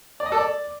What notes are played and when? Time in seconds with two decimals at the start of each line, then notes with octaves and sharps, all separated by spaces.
0.20 D5
0.26 D#5
0.32 A4
0.38 D5